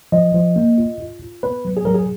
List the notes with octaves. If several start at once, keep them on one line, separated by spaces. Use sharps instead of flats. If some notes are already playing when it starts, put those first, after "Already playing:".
F3 D#5
F3
A#3
F4
F4
F4
B3 B4
F#3
G#4
F#3 A#4
G#4